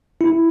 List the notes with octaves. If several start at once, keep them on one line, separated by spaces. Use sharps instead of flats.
E4